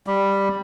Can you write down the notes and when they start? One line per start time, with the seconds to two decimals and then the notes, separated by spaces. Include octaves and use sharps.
0.07 G3